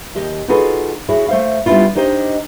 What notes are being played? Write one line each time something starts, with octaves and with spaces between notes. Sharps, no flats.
D#2 G4 D#5
D#4 F4 F#4 G#4 A4 B4
E4 F#4 G#4 C#5
A3 C5 E5 F5
G3 B3 C#4 D4 E4 F4
D4 D#4 G4 C5 D#5